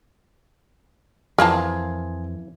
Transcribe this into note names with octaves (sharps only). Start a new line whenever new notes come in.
F2 E3 A#3 F4 G#4 A#4 A5